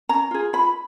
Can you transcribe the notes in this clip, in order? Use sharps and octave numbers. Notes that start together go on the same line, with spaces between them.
C#4 A#5
F4 G#4
F4 B5